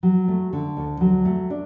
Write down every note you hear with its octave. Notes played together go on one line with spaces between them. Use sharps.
F#3
A3
D3
D2
F#3
A3
D4